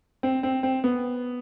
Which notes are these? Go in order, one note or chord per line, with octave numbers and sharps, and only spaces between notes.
C4
C4
C4
B3